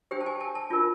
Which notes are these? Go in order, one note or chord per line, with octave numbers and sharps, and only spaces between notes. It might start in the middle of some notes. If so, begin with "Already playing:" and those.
D4 G4 C5 G5
A5
G#5
A5
A5
D4 F4 A#4